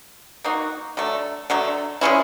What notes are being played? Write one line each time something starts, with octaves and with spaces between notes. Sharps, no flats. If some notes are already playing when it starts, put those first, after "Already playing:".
A#3 D#4 F#4
D3 F#3 A3
D3 F#3 A3
F3 G#3 C#4 E4